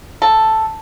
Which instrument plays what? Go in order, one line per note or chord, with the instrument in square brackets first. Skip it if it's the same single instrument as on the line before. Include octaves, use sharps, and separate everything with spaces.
[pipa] A4